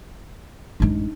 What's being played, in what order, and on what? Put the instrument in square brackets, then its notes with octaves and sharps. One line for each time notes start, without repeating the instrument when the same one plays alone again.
[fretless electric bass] A1 F#2 G#3 [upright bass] D4 D#4